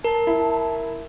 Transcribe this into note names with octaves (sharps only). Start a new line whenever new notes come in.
A#4 A5
E4